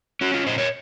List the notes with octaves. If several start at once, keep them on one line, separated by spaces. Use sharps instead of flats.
C#4 F#4
F4
A#2 C5 D#5
A#4 C#5